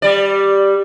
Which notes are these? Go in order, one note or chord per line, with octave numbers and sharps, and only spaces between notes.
G3 D5